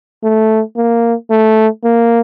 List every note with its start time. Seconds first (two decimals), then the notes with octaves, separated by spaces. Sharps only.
0.24 A3
0.77 A#3
1.30 A3
1.84 A#3